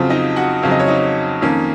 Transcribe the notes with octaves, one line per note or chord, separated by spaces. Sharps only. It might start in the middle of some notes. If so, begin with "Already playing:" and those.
Already playing: F2 C#3 F#3 C4 F4
D#4 D#5
F#4 F#5
F2 C#3 F#3 C4 F5
D#5
C#5
D#4 D#5
F2 D#3 A#3 C#4